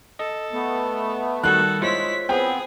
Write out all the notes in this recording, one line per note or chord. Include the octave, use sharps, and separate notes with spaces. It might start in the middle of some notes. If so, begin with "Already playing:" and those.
A4 D#5
A3 B3
D#3 G3 F#4 A4 F#6
G#3 E4 F4 C5 C#5 B6
B3 C4 G#4 G5